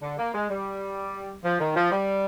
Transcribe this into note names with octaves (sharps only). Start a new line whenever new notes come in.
D3
A#3
G#3
G3
F3
D#3
F3
G3